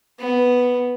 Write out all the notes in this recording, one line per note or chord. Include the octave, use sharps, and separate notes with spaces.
B3